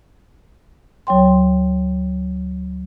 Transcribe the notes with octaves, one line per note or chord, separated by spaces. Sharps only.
D2 F#3 C#5 G5 C6